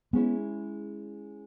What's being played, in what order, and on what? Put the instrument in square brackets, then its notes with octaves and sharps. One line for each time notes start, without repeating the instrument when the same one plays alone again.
[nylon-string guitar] G#3 C#4 E4 [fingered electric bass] B3